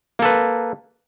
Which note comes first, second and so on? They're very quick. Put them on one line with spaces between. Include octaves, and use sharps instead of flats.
A#3 A4 B4